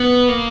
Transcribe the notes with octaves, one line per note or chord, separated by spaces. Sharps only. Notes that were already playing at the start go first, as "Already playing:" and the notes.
Already playing: B3
A#3